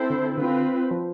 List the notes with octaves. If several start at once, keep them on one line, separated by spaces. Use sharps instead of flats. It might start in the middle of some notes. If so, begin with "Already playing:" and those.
Already playing: C4 E4 A4 C5
D3
D3 C4 F4 B4
F3